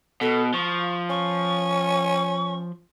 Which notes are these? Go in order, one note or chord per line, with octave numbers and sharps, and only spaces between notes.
B2 A4
F3 C#6
C#4 C#6